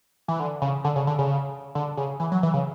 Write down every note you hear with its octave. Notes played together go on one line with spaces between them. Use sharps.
E3
D3
C#3
D3
C#3
D3
C#3
D3
C#3
E3
F#3
E3
C#3